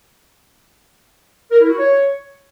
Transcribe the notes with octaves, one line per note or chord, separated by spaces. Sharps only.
A#4
E4
F#4
C#5